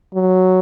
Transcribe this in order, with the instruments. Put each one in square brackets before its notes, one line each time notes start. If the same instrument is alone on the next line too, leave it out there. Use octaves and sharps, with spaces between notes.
[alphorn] F#3